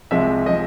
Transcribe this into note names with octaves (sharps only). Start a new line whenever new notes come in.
C2 C3 F3 G#3 E5
C3 F3 G#3 D#5